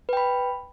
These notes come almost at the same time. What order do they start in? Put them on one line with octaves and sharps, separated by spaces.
B4 G5 B5